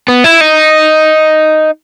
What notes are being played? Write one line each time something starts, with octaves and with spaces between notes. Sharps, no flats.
B3
E4
D#4